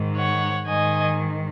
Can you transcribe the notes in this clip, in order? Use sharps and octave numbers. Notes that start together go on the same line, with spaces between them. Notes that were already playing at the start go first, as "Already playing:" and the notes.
Already playing: G#2 D#3
C#5 F#5
G#2 D#3 D#5 G#5